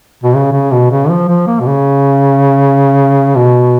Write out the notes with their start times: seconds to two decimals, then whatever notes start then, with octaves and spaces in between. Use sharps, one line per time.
0.23 B2
0.35 C#3
0.52 C#3
0.71 B2
0.91 C#3
1.09 F3
1.28 F3
1.47 A#3
1.60 B2
1.66 C#3
3.36 B2